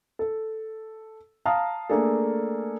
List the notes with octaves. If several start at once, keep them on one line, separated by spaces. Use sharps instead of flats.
A4
F5 A5 A#5 D#6 F6
A3 A#3 D4 G#4 A4